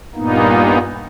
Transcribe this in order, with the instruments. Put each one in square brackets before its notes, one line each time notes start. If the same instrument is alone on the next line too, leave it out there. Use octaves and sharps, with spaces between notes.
[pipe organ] G2 A#2 A#3 B3 D#4